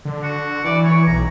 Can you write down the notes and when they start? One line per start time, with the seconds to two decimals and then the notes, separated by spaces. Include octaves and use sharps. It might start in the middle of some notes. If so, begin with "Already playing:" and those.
0.05 D3
0.23 F#4
0.64 E3 D5
0.84 E3 C#5
1.07 B1 A#5